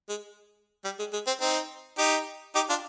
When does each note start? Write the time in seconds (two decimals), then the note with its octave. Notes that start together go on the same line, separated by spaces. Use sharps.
0.09 G#3
0.84 G3
0.99 G#3
1.13 G#3
1.27 C4
1.41 C4 D#4
1.98 D#4 G4
2.55 D#4 G4
2.69 D4 F4